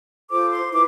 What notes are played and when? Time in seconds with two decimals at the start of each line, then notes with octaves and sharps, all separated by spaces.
0.30 F4 A4 C5 D6
0.50 C6
0.70 E4 B4 D6